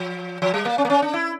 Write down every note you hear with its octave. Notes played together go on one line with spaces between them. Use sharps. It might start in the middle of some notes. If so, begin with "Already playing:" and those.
Already playing: F3
F3
G3
A#3
C#4
A#3
C#4
D4
E4